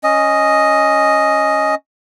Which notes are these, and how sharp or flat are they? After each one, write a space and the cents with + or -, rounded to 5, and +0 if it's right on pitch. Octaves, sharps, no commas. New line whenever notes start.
C#4 +0 D#5 +0